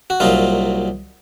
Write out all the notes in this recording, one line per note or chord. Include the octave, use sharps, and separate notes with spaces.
F#4
C2 A#2 F#3 D#4 F4